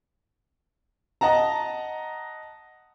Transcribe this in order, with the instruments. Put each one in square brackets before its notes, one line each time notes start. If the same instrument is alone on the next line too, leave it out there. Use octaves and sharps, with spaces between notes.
[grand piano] D#5 F#5 A5 A#5